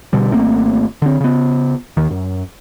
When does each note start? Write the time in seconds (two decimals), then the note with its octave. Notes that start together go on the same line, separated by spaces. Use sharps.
0.13 B2 D3 G3
0.31 G#1 A3 A#3 C4
1.02 D3 C4
1.21 C#3 B3
1.97 D#2 D#3
2.11 F#2